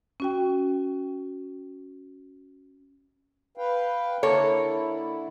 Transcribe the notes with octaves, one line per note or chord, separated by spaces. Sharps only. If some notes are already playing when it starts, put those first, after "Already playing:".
C#4 F#4 G5
B4 F5 G5
D3 A#3 E4 A4 C#5